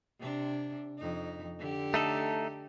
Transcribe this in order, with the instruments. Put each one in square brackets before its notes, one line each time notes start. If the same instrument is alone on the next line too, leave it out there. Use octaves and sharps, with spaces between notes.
[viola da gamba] C3 D4
F2 D#4
D3 G4
[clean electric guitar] A3 D#4 A4